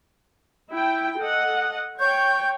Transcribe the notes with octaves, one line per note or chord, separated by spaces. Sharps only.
E4 G5
A4 D#5 F#5
C#5 G5 C#6 G6